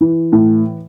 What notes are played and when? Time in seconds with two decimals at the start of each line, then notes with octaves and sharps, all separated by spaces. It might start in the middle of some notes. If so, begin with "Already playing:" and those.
0.01 E3
0.32 A2